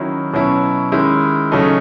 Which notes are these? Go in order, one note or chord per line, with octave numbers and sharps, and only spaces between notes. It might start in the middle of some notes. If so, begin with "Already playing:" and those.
Already playing: D#3 F#3 C#4 E4
B2 F#3 C#4 E4
D#3 G#3 C#4 E4
C#3 F#3 A3 D#4